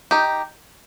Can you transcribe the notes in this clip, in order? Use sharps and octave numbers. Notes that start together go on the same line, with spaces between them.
D#4 G4